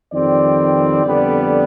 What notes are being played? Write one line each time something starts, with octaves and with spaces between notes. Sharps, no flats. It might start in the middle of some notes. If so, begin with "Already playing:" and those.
F2 D#3 G3 C4 D5
F2 D3 G3 B3